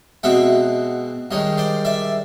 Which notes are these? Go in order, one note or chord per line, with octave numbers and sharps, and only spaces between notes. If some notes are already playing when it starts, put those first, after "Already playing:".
B2 G#3 C4 E5 F#5
G2 D#3 G#3 C#5 D#5
C5 D5
D5 E5